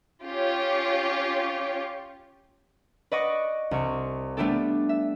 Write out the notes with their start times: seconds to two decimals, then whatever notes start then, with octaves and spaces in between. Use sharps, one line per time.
0.25 C#4 F4 G4 C#5
3.12 B4 D5 D#5 F#5 C#6 A#6
3.71 C2 C#6
4.37 G3 A3 B3 D4 G4 A4
4.89 E5